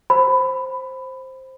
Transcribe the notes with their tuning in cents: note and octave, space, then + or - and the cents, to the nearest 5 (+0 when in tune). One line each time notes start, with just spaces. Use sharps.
C5 +5 B5 +15